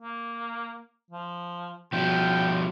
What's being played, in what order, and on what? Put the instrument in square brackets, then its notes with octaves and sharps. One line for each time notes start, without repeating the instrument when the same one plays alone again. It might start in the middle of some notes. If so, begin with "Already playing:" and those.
[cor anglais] A#3
F3
[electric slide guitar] B2 F3 [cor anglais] G5